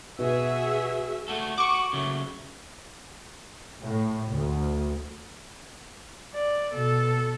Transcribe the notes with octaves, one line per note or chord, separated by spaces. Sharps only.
B2 F#4 G#4 E5
A3 F#4 A4
F#4 C#6 D6
C#3 F#3 A3
A2
D2
D5
B2 A4